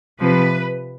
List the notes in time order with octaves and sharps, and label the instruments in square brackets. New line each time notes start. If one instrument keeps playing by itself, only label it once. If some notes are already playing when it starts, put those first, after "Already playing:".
[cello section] C3 F3 B4